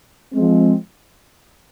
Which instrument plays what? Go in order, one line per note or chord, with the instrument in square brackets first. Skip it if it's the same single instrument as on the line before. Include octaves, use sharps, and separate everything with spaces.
[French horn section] F3 G#3 C4